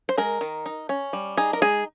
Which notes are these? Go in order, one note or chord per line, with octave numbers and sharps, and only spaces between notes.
C5
G#3 A#4
D#3
D#4
C#4
G3
D#4 G#4
A#4
G#3 G#4